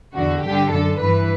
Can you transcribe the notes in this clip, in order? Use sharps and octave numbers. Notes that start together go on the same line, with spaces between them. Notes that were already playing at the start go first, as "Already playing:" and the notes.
E2 D3 F#4
G2 D3 G4
F#2 D3 A4
G2 E3 B4